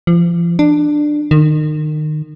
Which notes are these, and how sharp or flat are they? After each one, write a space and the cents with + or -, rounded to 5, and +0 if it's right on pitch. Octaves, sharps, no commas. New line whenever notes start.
F3 -35
D4 +15
D#3 -30